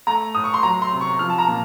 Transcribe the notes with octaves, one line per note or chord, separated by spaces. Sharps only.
A3 A#5
A2 D#6
C#6
C6
F#3 A#5
C6
C3
C#6
F3 F6
A5
A#5
A#2